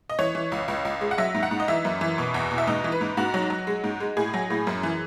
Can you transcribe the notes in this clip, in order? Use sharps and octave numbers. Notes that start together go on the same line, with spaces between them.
D#5
E3 C#5
E3
C#2
C#2
C#2
G#3
F#5
F#3 E5
G#2
F#5
G#2
D#5
E3 E5
F#2
E3
B2
E2
B2
E5
G#2 D#5
E3
B4
G#2
G#2 F#4
F#3
F#3
G#3
G#2
G#3
A2 G#4
F#3
A2
F#2
E3